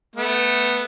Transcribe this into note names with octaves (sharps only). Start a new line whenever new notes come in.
A3 B3